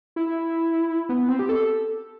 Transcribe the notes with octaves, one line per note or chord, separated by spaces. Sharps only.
E4
B3
C4
G4
A4